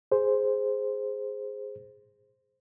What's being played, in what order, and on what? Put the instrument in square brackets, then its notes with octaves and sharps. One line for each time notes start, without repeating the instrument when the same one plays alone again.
[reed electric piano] G#4 C5